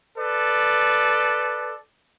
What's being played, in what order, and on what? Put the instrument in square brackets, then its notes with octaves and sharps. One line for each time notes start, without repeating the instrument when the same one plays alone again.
[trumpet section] A4 B4 D5